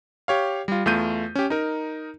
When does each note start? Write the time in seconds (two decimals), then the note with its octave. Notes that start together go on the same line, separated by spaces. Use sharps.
0.28 G4 C#5 F5
0.68 G3 F4
0.86 E2 A3 F4 G6 D#7
1.35 C#4 G4
1.50 D#4 A#4